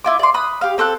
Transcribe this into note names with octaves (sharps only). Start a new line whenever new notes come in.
E4 F4 D6
D5 C6
B5 D#6 F#6
G4 F5
C4 A4 C#6 F#6